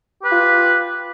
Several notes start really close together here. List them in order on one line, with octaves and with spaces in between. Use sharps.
G4 B4 F4